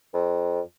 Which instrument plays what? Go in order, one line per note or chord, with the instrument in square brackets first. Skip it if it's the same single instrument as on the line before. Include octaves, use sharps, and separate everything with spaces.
[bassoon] F2